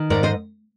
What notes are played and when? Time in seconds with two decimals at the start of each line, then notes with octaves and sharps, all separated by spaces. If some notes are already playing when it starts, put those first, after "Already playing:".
Already playing: D#3
0.10 G#2 A#4 D5
0.23 C5 D#5